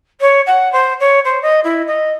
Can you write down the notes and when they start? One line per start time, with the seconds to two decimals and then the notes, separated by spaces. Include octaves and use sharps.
0.20 C#5
0.46 F#5
0.72 C5
1.00 C#5
1.24 C5
1.42 D#5
1.64 E4
1.87 D#5